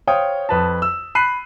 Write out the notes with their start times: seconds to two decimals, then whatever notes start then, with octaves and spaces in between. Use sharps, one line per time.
0.07 C5 C#5 F5 G5 D#6
0.49 F2 B4 A5
0.82 E6
1.15 B5 F#6 C7 D#7